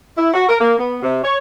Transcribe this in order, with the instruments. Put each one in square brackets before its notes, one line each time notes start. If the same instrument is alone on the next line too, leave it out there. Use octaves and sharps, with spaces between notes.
[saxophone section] E4
F#4
A#4
A#3
B3
C3
C#5